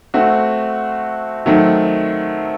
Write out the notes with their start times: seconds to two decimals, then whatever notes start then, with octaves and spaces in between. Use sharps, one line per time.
0.14 A3 C4 F#4
1.46 D#3 F#3 A3 C4